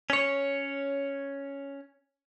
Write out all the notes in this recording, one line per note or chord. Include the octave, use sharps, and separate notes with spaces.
C#4 C#5